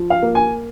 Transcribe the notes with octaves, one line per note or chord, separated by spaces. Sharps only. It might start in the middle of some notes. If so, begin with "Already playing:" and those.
Already playing: F3
F5
A#3
G#5